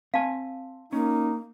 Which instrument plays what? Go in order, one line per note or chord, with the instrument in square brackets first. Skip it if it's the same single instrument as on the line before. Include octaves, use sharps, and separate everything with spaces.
[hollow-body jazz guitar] C4 G#5 [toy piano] F5 A5
[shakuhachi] A#3 [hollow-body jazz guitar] C#4 [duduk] D#4